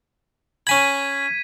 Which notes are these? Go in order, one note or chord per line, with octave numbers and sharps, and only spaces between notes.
C#4 G#5 B5 G#6 B6 D#7